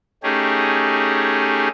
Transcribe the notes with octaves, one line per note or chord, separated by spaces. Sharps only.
A3 C#4 D#4 G4 G#4